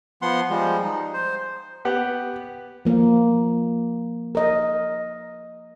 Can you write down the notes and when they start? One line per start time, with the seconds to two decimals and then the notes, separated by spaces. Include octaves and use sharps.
0.22 F3 B3 F#5 C6
0.50 F3 G3 G#3
0.83 D#4
1.14 C5
1.85 B3 G4 F#5
2.85 F3 A#3
4.35 A#4 D#5